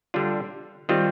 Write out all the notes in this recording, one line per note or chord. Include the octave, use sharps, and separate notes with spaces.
D3 G3 D4 F4
D#3 G3 C4 F4